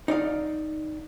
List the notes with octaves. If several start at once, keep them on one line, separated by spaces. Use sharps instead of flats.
D#4 D5 F5